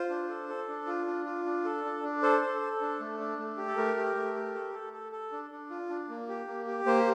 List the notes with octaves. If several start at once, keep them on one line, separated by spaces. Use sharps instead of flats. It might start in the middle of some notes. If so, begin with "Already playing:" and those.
Already playing: F4 C5
D4
A4
A4
D4
F4
D4
F4
D4
A4
D4
D4
A4 C5
A4
A4
D4
A3
D4
A3
G4
A4
A3 A#4
G4
A3
G4
A4
A4
A4
A4
D4
D4
F4
D4
A#3
G4
A#3
G4
A#3 C5